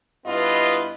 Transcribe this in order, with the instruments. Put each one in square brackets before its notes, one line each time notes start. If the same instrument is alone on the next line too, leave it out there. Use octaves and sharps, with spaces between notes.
[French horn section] G2 B3 E4 F4 B4 D#5